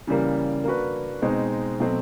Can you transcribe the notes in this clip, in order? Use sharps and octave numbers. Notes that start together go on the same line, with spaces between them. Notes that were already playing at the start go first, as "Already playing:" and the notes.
C#3 E3 G3 A#3
A#3 D4 F#4 B4
B2 G#3 C4 D#4
B2 F#3 A3 C4